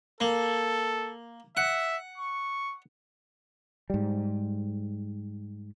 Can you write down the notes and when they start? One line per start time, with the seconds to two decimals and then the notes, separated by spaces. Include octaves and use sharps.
0.20 A#3 A4
1.57 E5 F#5
2.18 C#6
3.90 G#2 G3